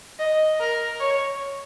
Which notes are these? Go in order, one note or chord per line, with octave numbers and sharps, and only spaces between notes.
D#5
A#4
C#5